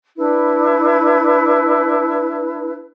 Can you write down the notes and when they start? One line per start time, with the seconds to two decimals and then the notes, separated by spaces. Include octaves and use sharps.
0.16 D4 E4 B4